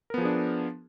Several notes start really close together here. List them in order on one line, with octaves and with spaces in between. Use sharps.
A#4 B3 F3 G#4 D4